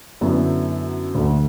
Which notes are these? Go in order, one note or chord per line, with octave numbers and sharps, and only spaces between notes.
F#2 D3 F#3 B3 E4
D2 D3 A3